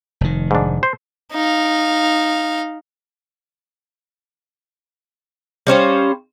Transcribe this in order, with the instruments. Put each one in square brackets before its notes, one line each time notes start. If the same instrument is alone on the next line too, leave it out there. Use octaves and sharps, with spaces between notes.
[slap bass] F1 D#3
[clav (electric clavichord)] G#2 D4
C5
[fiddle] D#4 F5
[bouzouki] G3 C#4 C5 F5